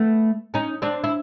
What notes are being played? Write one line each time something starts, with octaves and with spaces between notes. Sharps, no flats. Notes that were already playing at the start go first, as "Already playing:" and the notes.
Already playing: A3 B3
C#4 D#4
C4 D4
E4